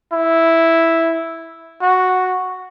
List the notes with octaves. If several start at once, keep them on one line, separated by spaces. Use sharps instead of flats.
E4
F#4